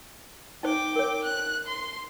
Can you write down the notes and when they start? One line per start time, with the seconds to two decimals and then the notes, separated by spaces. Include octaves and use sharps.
0.63 D#4 C5 G5 D6
0.96 A#4 C#5
1.25 F#6
1.67 C6